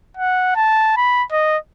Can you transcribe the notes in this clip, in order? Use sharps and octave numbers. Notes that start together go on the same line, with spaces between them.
F#5
A5
B5
D#5